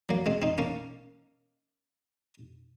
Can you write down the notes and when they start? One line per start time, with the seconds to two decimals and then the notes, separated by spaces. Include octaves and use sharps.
0.09 F#3 A#3
0.26 G#3 C4
0.42 C4 D#4
0.58 A#3 C#4